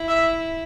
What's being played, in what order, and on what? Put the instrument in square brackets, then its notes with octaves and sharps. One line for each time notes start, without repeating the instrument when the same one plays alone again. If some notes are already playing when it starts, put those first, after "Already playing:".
Already playing: [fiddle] E4
[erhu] E5